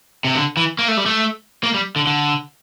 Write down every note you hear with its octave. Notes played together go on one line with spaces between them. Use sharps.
C3
D3
E3
A#3
A3
G3
A3
A#3
G3
D3
D3